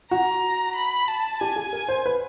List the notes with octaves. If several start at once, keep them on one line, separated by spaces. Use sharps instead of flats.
F#4 A#5
B5
A5
G4 G#5
G#4
A#4
C5
B4